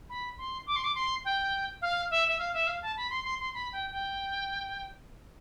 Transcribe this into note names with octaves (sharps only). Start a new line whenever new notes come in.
B5
C6
D6
C6
D6
C6
G5
F5
E5
E5
F5
E5
F5
A5
B5
C6
C6
C6
B5
G5
G5